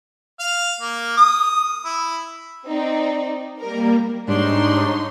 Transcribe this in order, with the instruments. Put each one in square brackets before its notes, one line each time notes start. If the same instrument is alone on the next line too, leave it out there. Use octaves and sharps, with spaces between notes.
[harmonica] F5
A#3
D#6
E4
[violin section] C4 D#4 D5
[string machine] G3 A#3 [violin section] A#4
[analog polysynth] G#2 G3 [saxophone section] D4 [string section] D#4 C#5 C6